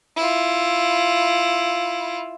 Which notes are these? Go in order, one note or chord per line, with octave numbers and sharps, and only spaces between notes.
E4 F4